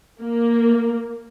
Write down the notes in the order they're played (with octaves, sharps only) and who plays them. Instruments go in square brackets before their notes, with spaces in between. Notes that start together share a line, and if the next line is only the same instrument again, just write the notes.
[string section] A#3